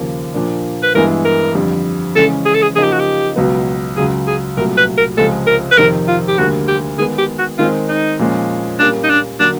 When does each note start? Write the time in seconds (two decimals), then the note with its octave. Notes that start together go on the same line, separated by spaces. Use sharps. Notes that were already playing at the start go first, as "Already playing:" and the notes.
Already playing: D#2 C#3 F3 A#3
0.34 A#2 F3 A#3 D4
0.83 B4
0.95 G2 E3 G#3 B3 E4 A#4
1.25 A#4
1.55 F2 D3 G3
2.15 C#3 E3 G#3 C#4 A4
2.45 G#4
2.54 A4
2.62 G#4
2.76 C#3 F3 A#3 D#4 G#4
2.84 G4
2.92 F#4
3.00 G4
3.36 C#2 B2 F#3 B3
3.96 C#2 C#3 F#3 G#4
4.27 G#4
4.57 C2 A#2 F#3 A3 A#4
4.77 B4
4.97 A#4
5.17 C#2 C3 F3 G#3 A4
5.47 A#4
5.71 B4
5.78 F2 C3 D#3 A#4
6.08 F4
6.28 G4
6.38 D2 D3 G3 A#3 F#4
6.68 G4
6.98 D#3 G#3 B3 G#4
7.18 G4
7.38 F#4
7.58 D#3 G#3 C4 F4
7.89 D#4
8.19 A#2 F3 G#3 C#4
8.79 A#2 G3 A#3 C#4 D4 F4
9.03 D#4
9.10 D4
9.40 D3 F#3 A#3 D4